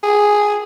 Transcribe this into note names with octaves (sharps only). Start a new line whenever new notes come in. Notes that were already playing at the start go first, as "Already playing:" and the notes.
G#4